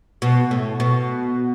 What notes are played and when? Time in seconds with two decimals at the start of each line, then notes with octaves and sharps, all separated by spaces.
0.22 B2
0.51 A2
0.80 B2